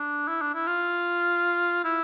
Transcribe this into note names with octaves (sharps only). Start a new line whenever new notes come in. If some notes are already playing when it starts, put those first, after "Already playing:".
Already playing: D4
E4
D4
E4
F4
E4